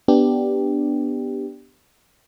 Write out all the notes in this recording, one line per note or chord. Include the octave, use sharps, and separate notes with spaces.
B3 D4 G4